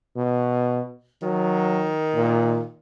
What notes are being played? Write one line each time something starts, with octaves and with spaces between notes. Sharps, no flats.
B2
D#3 F#3
A#2